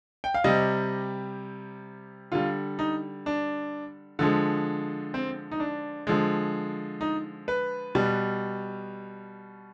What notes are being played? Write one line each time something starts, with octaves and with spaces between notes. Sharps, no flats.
G5
F5
C3 G3 D#5
D3 G3 F4
D#4
D4
D3 F3 G#3
C4
D#4
D4
D3 F3 G#3
D#4
B4
B2 G3